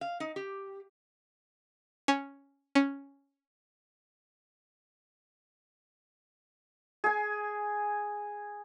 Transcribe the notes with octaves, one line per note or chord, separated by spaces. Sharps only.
F5
D#4
G4
C#4
C#4
G#4 G#5